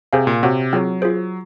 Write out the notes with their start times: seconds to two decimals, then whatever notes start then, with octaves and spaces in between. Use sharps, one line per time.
0.13 C3 G#4 C5 F5 G#5
0.27 A#2
0.43 C3 F#4 C#5 F#5
0.73 F#3 C4 F4 G#4 C#5
1.02 F4 G#4 C5